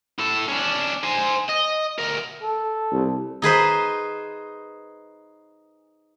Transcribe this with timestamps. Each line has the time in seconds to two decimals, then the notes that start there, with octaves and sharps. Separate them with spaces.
0.19 A2 A4
0.49 C#4 D4
1.04 C5 G#5
1.49 D#5
1.99 D2 A#4
2.43 A4
2.92 C2
3.42 D#4 G#4 B4 C5